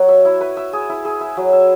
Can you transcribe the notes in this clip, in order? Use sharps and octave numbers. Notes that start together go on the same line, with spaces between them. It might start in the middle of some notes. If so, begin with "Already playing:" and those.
Already playing: F#3 F#4 C#5
E5
E4
B4
E5
G#4
E4
G#4
E5
F#3
E5